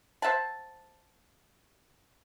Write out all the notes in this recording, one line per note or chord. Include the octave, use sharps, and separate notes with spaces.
C5 E5 F#5 A5